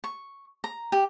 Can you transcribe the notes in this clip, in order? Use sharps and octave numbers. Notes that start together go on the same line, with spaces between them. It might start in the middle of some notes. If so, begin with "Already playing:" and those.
C#6
A#5
G4